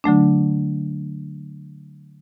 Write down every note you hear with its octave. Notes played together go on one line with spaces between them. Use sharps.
D3 F#3 A3 D4